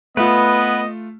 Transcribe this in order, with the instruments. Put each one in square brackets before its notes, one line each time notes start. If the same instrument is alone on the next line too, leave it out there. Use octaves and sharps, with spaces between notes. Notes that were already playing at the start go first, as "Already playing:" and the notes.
[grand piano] A3 F4 [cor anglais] B3 [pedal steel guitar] B4 [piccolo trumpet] D#5